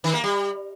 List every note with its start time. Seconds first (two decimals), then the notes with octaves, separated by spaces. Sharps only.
0.04 D#3
0.14 A#3
0.24 G3